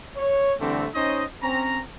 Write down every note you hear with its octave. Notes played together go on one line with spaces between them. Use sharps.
C#5
D3 E3 G3 A3 C4
C#4 D#4 C5 C#5 D#5
C4 C#4 A#5